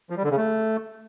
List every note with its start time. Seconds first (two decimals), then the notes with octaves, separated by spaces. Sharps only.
0.10 F3
0.17 G3
0.24 D3
0.31 C#3
0.37 A3